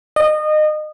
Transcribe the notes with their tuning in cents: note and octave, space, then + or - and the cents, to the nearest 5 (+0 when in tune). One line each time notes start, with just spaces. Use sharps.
D#5 -25